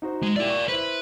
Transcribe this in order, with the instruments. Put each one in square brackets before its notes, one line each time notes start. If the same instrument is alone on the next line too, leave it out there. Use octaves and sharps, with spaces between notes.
[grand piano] D#4 F#4 C5
[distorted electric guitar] G#3
[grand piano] E4 G4 [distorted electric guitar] A#4 D5
[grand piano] C#6
[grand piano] E4 C5 [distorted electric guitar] B4